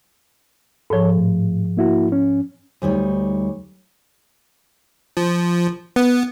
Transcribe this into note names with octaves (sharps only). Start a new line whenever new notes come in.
G#2 F3 A4 C#5
A2
A#3 E4 F#4
C#4
D2 G3 D#4 C#5
F3
B3